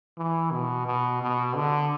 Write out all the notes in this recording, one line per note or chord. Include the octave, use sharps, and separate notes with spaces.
E3
B2
B2
B2
D3